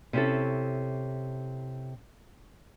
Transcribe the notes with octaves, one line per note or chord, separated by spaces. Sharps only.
C3 C#4 E4 A4